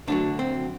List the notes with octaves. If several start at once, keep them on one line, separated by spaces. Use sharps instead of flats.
D2 D3 F#3 D4
C4